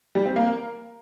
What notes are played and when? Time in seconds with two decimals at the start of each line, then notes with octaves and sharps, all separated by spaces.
0.15 G3
0.26 C4
0.36 A#3
0.46 A#4